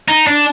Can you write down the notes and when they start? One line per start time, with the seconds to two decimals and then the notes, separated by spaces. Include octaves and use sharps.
0.08 D#4
0.27 D4